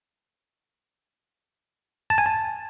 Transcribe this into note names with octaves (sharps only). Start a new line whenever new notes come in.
A5
G#5
A5